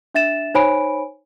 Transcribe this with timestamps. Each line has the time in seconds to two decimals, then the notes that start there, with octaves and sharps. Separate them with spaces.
0.14 D4 E5 A6 E7
0.54 D#4 C5 C#5 G#5 B5 D7